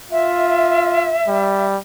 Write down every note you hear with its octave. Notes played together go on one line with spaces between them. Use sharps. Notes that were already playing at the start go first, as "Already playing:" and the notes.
F4 E5
G3